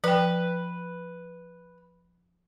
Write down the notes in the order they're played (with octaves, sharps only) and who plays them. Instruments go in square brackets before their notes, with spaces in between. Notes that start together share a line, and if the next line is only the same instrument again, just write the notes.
[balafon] F3 G5 [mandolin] B4